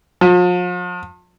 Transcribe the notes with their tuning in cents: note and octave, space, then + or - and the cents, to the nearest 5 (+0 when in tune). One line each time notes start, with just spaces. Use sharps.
F3 +40